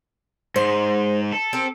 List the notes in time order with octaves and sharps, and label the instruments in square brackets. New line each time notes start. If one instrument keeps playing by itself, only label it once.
[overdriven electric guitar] G#2 G#3 [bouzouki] C5
[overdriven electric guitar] A4
[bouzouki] C4 G4 A#4